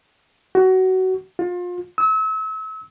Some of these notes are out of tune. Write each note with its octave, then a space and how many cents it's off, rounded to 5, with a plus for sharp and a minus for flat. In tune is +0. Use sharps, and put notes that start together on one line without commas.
F#4 +20
F4 +30
E6 -35